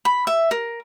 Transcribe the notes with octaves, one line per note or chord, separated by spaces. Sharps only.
B5
E5
A#4